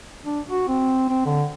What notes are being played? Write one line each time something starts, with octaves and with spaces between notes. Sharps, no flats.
D4
F#4
C4
C4
D3